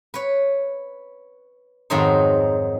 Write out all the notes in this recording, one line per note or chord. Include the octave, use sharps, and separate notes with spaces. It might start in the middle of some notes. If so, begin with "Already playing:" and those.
B4 C#5
F2 G#2 D#3 F#3 D#4 C5